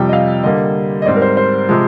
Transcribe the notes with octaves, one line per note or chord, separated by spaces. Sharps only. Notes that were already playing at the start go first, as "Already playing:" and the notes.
Already playing: F2 C3 G3 G5
D#5
F5
D3 G3 A#3 D#5
D#5
G#2 G3 C4 D5
A#4
C5
C5
C3 F3 G#3